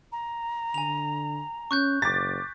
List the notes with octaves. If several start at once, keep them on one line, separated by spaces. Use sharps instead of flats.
A#5
D3 G#5 F7
C#4 C#6 F#6 G6
F#1 D6 A6 B6